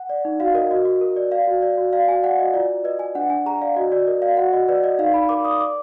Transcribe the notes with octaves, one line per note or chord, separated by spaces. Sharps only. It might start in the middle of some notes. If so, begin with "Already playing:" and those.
Already playing: F#5
D5
D#4
F#4 F5
A#4 D#5
F#4 D#5
F#4
A#4
D5
D5 F5
F#4
D5
F#4
D5 F5
F#4 G#5
D5 F#5
F#4 D#5
F4 D5
F4
B4 D#5
D5 G#5
D4 F#5
D4 G#5
G#4 A#5
D5 F5
F#4 D#5
F#4 D5
A#4 D#5
D5 F5
F#4 F#5
F#4 D#5
B4 D5
D5 D#5
D#4 F5
D#4 B5
A#4 D6
D5 D#6
D5 D6